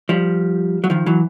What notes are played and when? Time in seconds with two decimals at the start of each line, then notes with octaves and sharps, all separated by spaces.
0.09 F3 G3
0.84 F#3
0.90 D#3 F3
1.06 E3 F#3